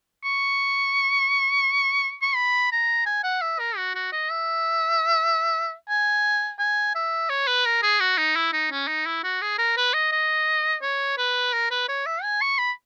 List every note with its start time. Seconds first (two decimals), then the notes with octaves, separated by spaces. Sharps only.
0.24 C#6
2.22 C#6
2.35 B5
2.72 A#5
3.06 G#5
3.24 F#5
3.41 E5
3.59 A#4
3.77 F#4
3.95 F#4
4.12 D#5
4.30 E5
5.89 G#5
6.59 G#5
6.95 E5
7.29 C#5
7.47 B4
7.65 A#4
7.83 G#4
8.00 F#4
8.18 D#4
8.36 E4
8.53 D#4
8.71 C#4
8.88 D#4
9.06 E4
9.24 F#4
9.42 G#4
9.58 A#4
9.77 B4
9.94 D#5
10.12 D#5
10.82 C#5
11.18 B4
11.53 A#4
11.71 B4
11.88 C#5
12.06 E5
12.23 G#5
12.42 C#6
12.58 B5